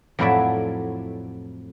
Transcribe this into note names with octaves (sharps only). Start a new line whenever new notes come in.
F2 A2 F#3 E4 D5 E5